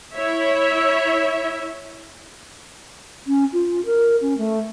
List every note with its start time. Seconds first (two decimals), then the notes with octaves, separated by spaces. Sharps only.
0.14 E4 C#5 E5
3.26 C#4
3.53 F4
3.85 A#4
4.20 C#4
4.37 A3